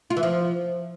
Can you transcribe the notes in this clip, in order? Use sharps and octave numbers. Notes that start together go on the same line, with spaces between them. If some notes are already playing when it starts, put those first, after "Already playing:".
F4
E3
F3